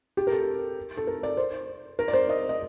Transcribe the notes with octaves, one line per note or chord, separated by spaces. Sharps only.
G4
A#4
A4
A4
A#4
D5
C5
A#4
D5
C5
D#5
D#5